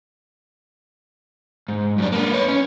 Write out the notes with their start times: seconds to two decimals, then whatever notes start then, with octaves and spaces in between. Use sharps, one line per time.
1.68 G#2
1.98 F#2 D4
2.12 A#3 B4
2.33 B4 C#5
2.48 C#4